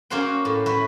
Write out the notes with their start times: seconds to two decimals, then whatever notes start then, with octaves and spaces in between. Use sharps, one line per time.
0.10 A#3 C#4 F#4 C5 F#5 G5
0.45 A2
0.66 E4 F#4 B4